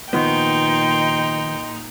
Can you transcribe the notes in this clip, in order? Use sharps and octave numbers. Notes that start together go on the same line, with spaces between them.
A#2 D#3 F3 B3 D#4 D#5 G5 C6